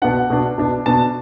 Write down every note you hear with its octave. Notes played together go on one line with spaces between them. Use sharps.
B2 B3 D4 F#5
B2 B3 D4
B2 B3 D4
B2 B3 D4 A5